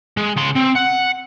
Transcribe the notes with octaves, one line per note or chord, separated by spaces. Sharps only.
G#3
C#3 C6
C4
F#5